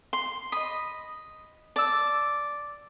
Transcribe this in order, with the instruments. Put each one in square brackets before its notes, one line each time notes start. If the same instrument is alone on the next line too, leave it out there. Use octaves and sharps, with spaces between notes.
[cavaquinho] C6
[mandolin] D#5 D#6 [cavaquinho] B5
[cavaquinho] D5 [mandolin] A5 E6